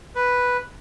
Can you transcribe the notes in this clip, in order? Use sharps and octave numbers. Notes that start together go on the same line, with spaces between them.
B4